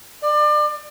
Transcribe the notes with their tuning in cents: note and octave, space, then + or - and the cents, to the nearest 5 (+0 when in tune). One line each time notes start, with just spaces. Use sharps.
D5 +30